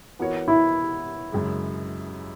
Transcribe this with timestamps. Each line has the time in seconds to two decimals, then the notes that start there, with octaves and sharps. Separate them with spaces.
0.19 E3 B3 F#4 A#4 C#5
0.48 E4
1.33 F#2 C#3 G#3